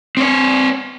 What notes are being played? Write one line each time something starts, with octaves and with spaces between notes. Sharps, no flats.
C4 C#5